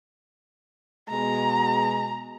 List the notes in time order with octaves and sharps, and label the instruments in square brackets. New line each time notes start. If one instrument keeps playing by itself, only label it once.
[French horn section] B2 G#3 [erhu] A#5